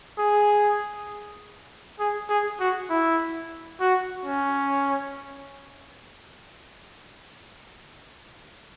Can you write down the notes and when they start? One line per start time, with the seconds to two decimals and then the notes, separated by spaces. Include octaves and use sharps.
0.18 G#4
1.99 G#4
2.29 G#4
2.60 F#4
2.90 E4
3.80 F#4
4.25 C#4